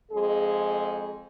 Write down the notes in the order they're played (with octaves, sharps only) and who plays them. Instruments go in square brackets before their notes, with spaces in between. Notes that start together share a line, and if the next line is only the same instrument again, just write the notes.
[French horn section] F2 G#3 G#4